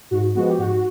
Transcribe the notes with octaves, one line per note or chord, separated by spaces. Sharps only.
G#2 F#4
F3 G#3 B3 F#4
G4
G#2 F#4